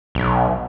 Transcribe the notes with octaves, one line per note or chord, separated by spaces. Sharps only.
B1